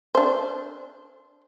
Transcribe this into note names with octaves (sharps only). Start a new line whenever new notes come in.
D4 C5